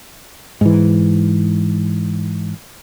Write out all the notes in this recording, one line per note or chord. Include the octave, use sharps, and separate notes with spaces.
G#2 E3